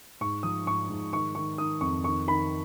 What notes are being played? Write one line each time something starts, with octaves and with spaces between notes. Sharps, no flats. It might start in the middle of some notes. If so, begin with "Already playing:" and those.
G#2 C#6
F3 D#6
G#2 C#6
G#2
D#3 C#6
D#3 C#6
D#3 D#6
F2 C#6
D#3 C#6
D#3 B5